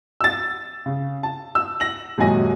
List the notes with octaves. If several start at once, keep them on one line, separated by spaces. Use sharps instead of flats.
E6 A6
C#3
A5
E6
A#6 F#7
D#1 F#2 F#3 G#3 G#5 A#6